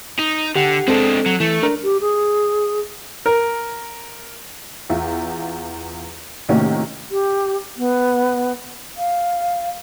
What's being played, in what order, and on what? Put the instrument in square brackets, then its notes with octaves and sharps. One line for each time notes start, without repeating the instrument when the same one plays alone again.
[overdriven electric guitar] D#4
[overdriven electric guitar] D3 [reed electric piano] G4 F#5
[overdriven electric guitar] G#3 D4 [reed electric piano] C4 A4
[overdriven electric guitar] F#3
[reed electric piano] E3 [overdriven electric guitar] A3
[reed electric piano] D4 A#4
[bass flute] G4
G#4
[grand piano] A#4
[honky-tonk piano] E2 F4 E5
A2 C3 D#3 A#3 C#4 F#4
[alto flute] G4
B3
F5